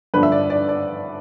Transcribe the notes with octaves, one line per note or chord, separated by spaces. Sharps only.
G2 D3 F3 B4
E5
D5
D5
D5